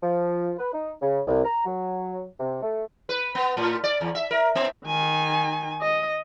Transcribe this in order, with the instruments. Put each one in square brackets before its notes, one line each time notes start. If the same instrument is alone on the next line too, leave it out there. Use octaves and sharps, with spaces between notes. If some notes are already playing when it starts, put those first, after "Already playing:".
[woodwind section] F3
B4
D#4
C#3
C2
A#5
F#3
C3
A3
[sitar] B4
B3
A2
D5
E2
E5
A#4
B3
[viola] D#3 G#5
D#5